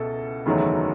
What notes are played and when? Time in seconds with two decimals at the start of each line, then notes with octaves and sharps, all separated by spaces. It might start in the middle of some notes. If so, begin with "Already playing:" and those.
Already playing: C#2 B2 E4 A4
0.46 F#1 E2 D#3 F#3 A3